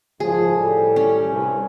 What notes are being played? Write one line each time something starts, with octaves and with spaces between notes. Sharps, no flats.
F#1 G#2 F3 G#4
A2 G3 A4
C#4
C2 G2